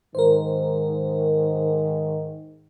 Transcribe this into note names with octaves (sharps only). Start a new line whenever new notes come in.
G#2 D#3 A#4 C5